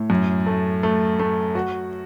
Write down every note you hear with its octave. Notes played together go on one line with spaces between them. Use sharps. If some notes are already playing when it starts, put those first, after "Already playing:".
Already playing: A2
F#2
A3
A3
A3
F#4